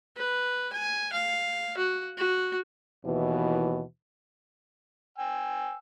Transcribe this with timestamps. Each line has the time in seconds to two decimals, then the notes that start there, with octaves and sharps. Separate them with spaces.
0.17 B4
0.73 G#5
1.13 F5
1.78 F#4
2.18 F#4
3.05 D#2 B2 E3
5.18 G5 G#5 E6